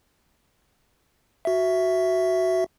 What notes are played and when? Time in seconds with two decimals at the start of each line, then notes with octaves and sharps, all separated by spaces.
1.45 F#4 E5